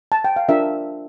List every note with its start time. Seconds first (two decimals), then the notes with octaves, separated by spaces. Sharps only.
0.12 A5
0.24 G5
0.36 F5
0.49 D4 F4 A#4 E5